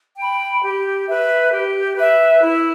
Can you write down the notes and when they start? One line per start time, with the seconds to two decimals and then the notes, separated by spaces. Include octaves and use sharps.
0.17 G5 B5
0.62 G4
1.07 B4 E5
1.52 G4
1.96 B4 E5
2.41 E4